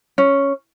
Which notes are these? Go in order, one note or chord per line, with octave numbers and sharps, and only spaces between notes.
C#4